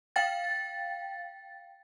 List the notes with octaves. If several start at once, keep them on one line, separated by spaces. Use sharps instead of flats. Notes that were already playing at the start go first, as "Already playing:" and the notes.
F5 G5 A6